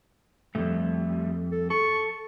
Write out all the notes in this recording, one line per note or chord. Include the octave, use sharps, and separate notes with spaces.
F2 G#2 G3 A3
A4
A4 C#6